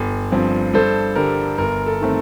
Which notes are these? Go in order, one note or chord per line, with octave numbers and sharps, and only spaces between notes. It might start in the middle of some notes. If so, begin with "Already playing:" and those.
Already playing: G1
G2 F3 C4
G2 A4 C5
D3 G3 A#4
G1 A#4
A4
D#3 A3 C4